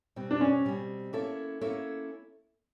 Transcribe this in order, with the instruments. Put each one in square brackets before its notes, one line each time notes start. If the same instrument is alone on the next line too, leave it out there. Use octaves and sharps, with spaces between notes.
[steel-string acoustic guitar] B2 G3 C4
[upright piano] D4
C#4
[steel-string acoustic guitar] B2 G3 C4
A#3 C#4 E4 A4 C#5
A#3 C#4 E4 A4 C#5